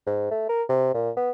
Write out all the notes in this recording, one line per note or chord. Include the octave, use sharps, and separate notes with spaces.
G#2
A3
A#4
C3
A#2
B3